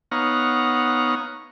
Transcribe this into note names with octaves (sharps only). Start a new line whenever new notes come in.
B3 D#4 C#5 F5 F#5 A#5